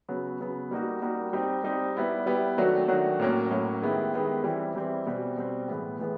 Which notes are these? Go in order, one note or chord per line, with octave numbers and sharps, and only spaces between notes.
C#3 F#3 B3
C#3 F#3 B3
G3 A#3 D#4 F#4
G3 A#3 D#4 F#4
G3 C4 D#4 G4
G3 C4 D#4 G4
G3 B3 E4 G4
G3 B3 E4 G4
D#3 F#3 A3 D4 F#4
D#3 F#3 A3 D4 F#4
A2 F#3 A#3 C#4
A2 F#3 A#3 C#4
D#3 G#3 B3 E4 G4
D#3 G#3 B3 E4 G4
E3 G3 C4 E4
E3 G3 C4 E4
B2 G3 C4
B2 G3 C4
A2 E3 G#3 B3
A2 E3 G#3 B3